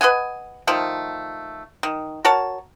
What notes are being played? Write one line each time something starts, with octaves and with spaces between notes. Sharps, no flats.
B4 D#5 F#5 G#5
D#3 F3 A3
D#3
F#4 A#4 C#5 A5